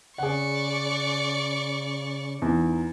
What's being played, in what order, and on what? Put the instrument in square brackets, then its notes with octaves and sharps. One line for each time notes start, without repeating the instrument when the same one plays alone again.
[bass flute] C#3 [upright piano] G#4 F#5 [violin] D5 C#6
[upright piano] E2 [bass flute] D#4